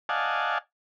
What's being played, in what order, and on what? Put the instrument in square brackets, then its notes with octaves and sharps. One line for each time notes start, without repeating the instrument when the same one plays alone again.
[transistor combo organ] D5 D#5 F5 F#5 G#5 A5